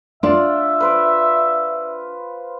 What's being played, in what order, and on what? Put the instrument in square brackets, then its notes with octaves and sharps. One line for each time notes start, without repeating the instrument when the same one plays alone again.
[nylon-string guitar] D4 D5 [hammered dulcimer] F4 [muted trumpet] E5
[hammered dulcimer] B4 C5 D6